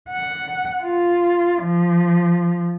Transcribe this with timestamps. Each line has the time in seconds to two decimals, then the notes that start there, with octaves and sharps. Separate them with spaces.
0.10 F#5
0.83 F4
1.62 F3